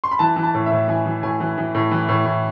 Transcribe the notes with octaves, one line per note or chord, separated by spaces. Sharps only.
C6
B5
E3 A5
E3
A5
A2
E5
A2
E3 G#5
E3
A2 G#5
E3
E3
A2
E3
A2
A2